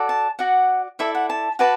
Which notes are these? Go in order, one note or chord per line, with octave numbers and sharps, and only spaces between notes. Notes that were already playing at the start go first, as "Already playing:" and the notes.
Already playing: F#4 A4 D5
A5
F#4 D5 F#5
E4 A4 D5 E5
F#5
A5
F#4 B4 D5 A5